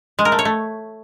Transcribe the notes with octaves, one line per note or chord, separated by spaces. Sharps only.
G#3
A#4
A3
C#5
A3